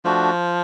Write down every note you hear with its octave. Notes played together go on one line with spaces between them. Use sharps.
F3 A3 D4 F#4